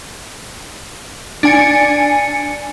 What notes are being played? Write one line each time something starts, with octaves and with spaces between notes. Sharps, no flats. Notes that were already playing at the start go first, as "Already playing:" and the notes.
D4 G#5 C#7